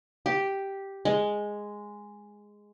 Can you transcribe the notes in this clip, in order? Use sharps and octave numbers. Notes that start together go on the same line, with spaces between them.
G4
G#3